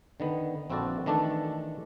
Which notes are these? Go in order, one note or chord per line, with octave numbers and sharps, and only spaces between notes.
D3 D#3 B3
A#1 C4 E4 F#4 A4 D5
D#3 E3 A3 D4 A4 A5